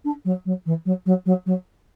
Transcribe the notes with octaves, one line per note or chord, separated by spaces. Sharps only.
D4
F#3
F#3
E3
F#3
F#3
F#3
F#3